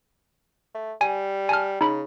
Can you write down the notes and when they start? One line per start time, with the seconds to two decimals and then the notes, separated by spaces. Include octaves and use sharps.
0.75 A3
1.01 G3 G#5
1.49 G#5 A5 F6
1.81 C#3 D#4 B5